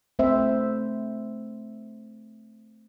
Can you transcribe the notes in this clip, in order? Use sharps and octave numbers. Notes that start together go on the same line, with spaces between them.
A3 C4 C5 E5